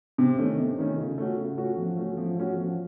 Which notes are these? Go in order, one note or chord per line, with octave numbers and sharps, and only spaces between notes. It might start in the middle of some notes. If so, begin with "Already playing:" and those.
C3
D#3 A3 C#4
C3
D#3 A3 C#4
C#3
A3 C#4 F#4
C#3
A3 C#4 F#4
F3
A3 C#4 F#4
F3
A3 C#4 F#4
F3